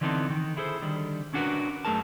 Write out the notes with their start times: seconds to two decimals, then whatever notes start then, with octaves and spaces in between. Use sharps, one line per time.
0.01 D3 E3 B3 C4 D#4 A4
0.30 D#3
0.57 E4 G#4 A4 C5
0.82 D3 D#3 G3
1.34 C#4 D4 F#4 G4 A#4 B4
1.85 F#2 A3 G#4 A#4 A5